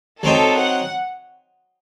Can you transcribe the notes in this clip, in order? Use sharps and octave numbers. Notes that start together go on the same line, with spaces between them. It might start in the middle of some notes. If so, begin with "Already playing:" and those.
F#3 C4 D#4 A4
F#5